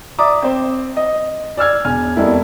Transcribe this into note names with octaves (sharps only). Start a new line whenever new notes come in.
D5 E5 A#5 D6 D#6
C4 C5
D#5
D5 E6 F6 G#6
E1 G#5 F6
F2 B2 G3 A#3 E4